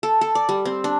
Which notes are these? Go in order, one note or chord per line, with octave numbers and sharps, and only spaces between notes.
A4
A4
D5
G3
C4
D4